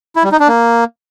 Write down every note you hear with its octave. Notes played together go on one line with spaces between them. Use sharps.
E4
G3
D#4
D4
A#3